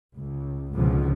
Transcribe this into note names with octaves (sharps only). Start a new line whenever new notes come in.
C#2
C#2 G#2 B2 D3 F3